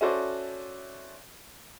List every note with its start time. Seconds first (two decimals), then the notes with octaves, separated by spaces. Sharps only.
0.01 C#4 E4 F#4 A4 C5 D5